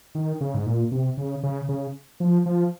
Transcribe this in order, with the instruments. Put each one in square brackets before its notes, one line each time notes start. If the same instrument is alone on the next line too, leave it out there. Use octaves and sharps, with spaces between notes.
[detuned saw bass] D#3
C#3
G#2
A#2
C3
C#3
C#3
C#3
F3
F3